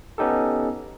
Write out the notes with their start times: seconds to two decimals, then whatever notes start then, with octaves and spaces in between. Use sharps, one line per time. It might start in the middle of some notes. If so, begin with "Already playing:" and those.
0.18 B3 C#4 D#4 G4 A4